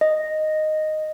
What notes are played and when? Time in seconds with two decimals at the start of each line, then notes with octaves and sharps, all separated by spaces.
0.01 D#5